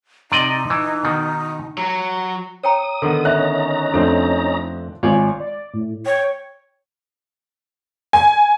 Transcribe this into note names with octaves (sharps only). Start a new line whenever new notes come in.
C3 D#4 D5 D#5
E3
B2 D#3
F#3
C#5 G5 A#5 D#6
D3 D#3 B3 A4
C#4 D#4 E5 A#5 F#6
F2 A3 C4 D4 A4 C5
G#1 F4 C#5 D5 G#5
D5
A2
C#5 G5
G#5